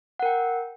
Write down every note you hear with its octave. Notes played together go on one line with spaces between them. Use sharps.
A#4 F#5 G5